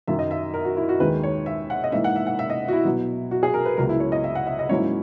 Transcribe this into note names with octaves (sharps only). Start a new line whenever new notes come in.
F#2 D#3 F#3 E5
D#5
E5
A#4
F#4
E4
F#4
D#2 D#3 G#3 B4
C#5
E5
F#5
D#5
G#2 E3 A#3 D#4 E5
F#5
E5
F#5
E5
D#5
F#4
E4
B2 F#3 B3
F#4
G#4
A#4
B4
C#2 C#3 F#3 B3 A#4
E4
C#5
D#5
E5
F#5
E5
D#5
G#2 F#3 A#3 C#4 E4 C#5